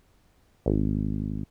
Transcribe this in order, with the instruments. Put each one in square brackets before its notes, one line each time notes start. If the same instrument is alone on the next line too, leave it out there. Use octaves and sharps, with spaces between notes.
[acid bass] G#1